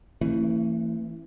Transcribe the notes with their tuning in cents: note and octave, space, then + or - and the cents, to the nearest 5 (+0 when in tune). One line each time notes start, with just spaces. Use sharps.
E3 +5 A3 +40 C#4 -45